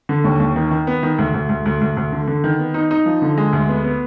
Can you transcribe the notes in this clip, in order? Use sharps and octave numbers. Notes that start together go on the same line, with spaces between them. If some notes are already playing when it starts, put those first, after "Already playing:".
D3
D#2
D#2
D#3
D#3
B3
D#3
D2
D2
D2
D2
D2
D2
D3
D3
D#3
B3
D#4
D#4
F3
D3
G#3
D2
B3
B3